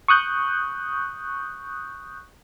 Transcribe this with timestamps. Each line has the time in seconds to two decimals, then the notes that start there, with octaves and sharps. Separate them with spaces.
0.08 C#6 D#6 F#6 G6